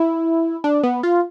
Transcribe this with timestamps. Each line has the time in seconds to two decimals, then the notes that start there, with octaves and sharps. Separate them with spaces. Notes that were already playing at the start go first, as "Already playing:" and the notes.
Already playing: E4
0.64 D4
0.83 B3
1.03 F4